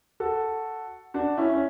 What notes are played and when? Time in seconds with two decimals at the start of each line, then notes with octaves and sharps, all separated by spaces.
0.20 F#4 A4
1.14 D4 F#4
1.38 C#4 E4
1.54 C#4